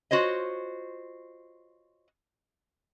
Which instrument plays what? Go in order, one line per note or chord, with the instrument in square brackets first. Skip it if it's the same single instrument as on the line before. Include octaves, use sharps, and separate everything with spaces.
[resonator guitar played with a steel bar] F4 F#4 C5 C#5 D#5